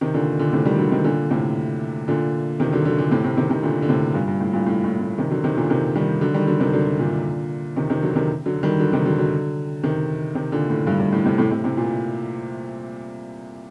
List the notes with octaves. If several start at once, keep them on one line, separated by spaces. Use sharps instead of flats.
C3 D#3
A#2 D3
A#2 D3
A2 C3
D#3 G3
D3 F#3
C3 D#3
A#2 D3
A2 C3
A#2 D3
C3 D#3
D3 F#3
D3 F#3
A#2 D3
A2 C3
A2 C3
C3 D#3
C3 D#3
A#2 D3
D3
A2 C3
G2 A#2
G2
A2
G2 A#2
A2
A2
A2
C3 D#3
D3 F#3
C3 D#3
A#2 D3
C3 D#3
D#3 G3
D3 F#3
D#3 G3
D3 F#3
C3 D#3
D3 F#3
A#2 D3
C3 D#3
C3 D#3
D3 F#3
C3 D#3
D3 F#3
D#3 G3
D3 F#3
C3 D#3
D3 F#3
D3 F#3
C3 D#3
C3 D#3
A#2 D3
A2
G2
G2
A2
A2 C3
A2 C3
A2 C3
A2 C3
A#2